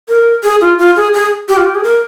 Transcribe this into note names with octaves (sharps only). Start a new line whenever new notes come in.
A#4
G#4
F4
F4
G#4
G#4
G4
F4
G4
G#4
A#4